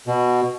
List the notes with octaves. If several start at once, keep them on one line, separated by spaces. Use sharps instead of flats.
B2